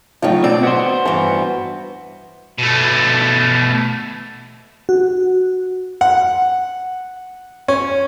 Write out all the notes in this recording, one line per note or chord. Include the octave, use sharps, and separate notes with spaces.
A2 C#3 F#3 D#4 F4
B2 C4 D5
B3 F#4 C5
G2 E3 B3
B2 A3
F#4
F#5
C#4